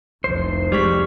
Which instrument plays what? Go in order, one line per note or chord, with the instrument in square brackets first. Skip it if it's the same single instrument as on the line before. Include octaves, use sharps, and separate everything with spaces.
[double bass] F1 C2 [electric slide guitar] F2 C5
[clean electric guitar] G3 G#3 [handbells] G4 C#6 B6